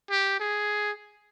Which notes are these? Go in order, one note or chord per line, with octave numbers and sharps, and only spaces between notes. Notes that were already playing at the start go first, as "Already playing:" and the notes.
G4
G#4